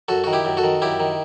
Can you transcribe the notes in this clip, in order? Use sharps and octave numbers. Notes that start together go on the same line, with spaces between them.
F#2 F#4 A4
D#3 F#4
E4 G4
F#2
F#4 A4
D#3
F#2 E4 G4
D#3